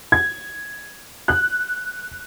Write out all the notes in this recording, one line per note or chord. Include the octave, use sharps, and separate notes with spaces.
G#6
F#6